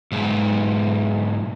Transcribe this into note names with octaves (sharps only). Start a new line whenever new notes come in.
B1 G#2